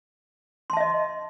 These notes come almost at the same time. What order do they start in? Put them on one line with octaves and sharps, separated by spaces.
C6 A5 E5 D#5